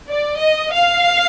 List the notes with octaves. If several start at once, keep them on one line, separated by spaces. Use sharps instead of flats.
D5
D#5
F5